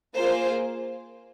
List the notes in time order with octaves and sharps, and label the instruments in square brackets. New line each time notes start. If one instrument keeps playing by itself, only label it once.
[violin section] A#3 F4 G#4 C5